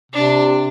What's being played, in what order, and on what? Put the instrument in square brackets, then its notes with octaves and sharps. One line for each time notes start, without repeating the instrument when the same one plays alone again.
[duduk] C3 [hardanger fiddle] D4